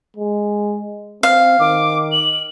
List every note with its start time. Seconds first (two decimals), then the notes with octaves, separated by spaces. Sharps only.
0.16 G#3
1.23 C4 F5
1.60 D#3 D6
2.12 F#7